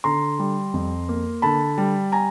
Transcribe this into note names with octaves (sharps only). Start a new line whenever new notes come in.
D3 A#5 C6
G3
F2
A#3
D3 A5 B5
G3
G#5 A#5